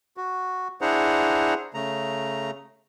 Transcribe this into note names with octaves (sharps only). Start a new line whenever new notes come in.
F#4
D4 E4 G#4 C5 F#5 A#5
C#3 A3 A#5